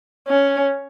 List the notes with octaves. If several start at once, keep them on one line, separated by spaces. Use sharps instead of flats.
C#4